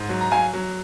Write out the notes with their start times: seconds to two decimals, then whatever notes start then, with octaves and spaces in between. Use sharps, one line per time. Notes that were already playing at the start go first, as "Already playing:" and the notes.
Already playing: G#2
0.09 F#3
0.21 A#5
0.31 F#3 F5 G#5
0.53 F#3